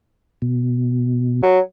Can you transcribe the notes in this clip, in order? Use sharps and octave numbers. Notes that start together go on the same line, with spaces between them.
B2
F#3